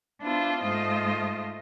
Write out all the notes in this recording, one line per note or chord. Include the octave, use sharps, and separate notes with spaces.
B3 D4 E4 F4 C5
G#2 A3 F4 C5 D#5